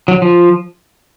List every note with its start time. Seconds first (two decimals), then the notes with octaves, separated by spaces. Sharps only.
0.08 F#3
0.22 F3